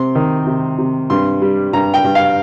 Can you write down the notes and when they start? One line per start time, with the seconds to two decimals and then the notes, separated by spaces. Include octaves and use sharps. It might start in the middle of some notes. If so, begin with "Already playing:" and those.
Already playing: C3 C4 C6
0.15 D#3
0.47 C3
0.78 C3
1.10 G2 C6
1.42 G3
1.73 G2 A#5
1.94 G5
2.04 G2
2.15 F5